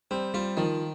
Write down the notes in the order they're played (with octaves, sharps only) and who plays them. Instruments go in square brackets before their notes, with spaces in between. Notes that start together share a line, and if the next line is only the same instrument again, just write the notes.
[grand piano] G3 [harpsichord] C4
[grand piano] G3 [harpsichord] F4
[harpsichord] D#3 [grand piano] F3